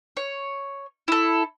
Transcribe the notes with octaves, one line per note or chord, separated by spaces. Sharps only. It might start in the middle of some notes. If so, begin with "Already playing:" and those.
C#5
E4 A4